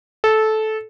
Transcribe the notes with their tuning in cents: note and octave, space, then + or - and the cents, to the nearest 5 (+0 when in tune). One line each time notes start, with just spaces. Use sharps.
A4 -15